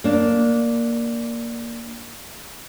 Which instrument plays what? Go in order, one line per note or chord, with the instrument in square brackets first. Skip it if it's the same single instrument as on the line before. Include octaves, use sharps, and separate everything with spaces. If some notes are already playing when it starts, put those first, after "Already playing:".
[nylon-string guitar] A#3 D4